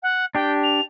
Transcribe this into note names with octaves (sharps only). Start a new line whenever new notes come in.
F#5
D4 G4 G5
F7